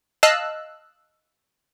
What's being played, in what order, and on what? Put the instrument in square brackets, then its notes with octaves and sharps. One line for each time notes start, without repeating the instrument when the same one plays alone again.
[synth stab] D#5 F5 A5 E6 F#6